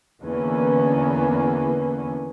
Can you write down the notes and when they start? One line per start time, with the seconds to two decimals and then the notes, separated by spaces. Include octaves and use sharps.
0.22 E2 D3 E3 A#3 B3 C#4